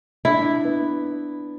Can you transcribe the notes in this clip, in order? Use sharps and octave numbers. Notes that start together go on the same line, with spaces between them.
D4 E4
B3